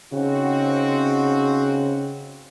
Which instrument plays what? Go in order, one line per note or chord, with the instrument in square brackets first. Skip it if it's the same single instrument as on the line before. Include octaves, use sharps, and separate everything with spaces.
[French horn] C#3 [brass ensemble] C4 D#4 F#4